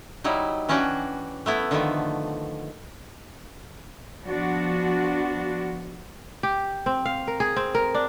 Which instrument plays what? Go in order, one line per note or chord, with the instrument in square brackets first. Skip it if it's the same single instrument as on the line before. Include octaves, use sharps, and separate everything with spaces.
[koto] F#3 G3 D#4 E4
E3 C#4 D4 F#4 G5
A3 B3 E4
D3 D#3 F3 A3 B3
[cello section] F3 B3 D4 F#4
[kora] G4
C4
F5
A#4
G#4
C4
A#4
D4